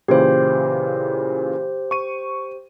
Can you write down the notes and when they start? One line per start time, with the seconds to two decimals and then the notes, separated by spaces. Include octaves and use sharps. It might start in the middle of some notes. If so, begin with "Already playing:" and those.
0.08 A#2 C#3 E3 G4 C5
1.91 C#6 D#7